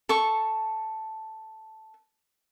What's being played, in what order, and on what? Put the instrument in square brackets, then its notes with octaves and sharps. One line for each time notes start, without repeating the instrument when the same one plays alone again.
[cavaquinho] A4 C#6